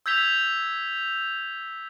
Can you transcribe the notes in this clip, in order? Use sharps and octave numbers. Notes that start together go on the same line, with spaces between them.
E6 G6 G#6 B6 F7 G7